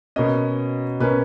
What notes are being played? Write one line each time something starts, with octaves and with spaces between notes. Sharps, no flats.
B2 A#3 C#4 D#5
B2 A#3 C#4 B4